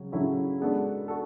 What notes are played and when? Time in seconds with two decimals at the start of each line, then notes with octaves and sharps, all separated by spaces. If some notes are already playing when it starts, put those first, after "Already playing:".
Already playing: C#3 F#3 C#4
0.12 C#3 F#3 C#4 E4 A4
0.60 G#3 B3 D4 F#4 A4
1.08 F#4 A4